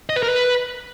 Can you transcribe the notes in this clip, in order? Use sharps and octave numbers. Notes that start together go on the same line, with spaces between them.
D#5
B4
A#4
B4